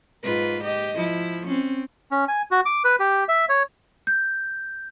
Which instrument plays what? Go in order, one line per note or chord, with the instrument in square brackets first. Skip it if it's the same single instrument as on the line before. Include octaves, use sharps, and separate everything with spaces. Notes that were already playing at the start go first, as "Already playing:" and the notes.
[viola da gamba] G#2 F4 B4
G4 D#5
F3 E4
C4 C#4
[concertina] C#4
G#5
F#4
D6
B4
G4
E5
C#5
[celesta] G6